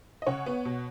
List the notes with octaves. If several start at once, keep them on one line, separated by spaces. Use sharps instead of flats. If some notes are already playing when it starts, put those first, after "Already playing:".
D#5
C#3 C#5 F#5
B3
B2